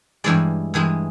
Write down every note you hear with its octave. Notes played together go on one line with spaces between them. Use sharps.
G2 E3 G#3 D5
G2 E3 G#3